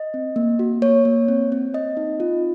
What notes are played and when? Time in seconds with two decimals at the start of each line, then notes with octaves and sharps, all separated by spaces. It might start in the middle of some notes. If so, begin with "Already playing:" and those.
Already playing: D#5
0.14 C4
0.36 A#3
0.59 F#4
0.82 A#3 C#5
1.05 A#3
1.28 C4
1.52 C4
1.74 C4 D#5
1.97 D#4
2.20 F4